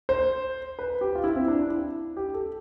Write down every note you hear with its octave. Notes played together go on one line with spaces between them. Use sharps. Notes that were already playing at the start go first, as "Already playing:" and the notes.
C5
B4
G4
F4
E4
C4
D4
E4
G4
A4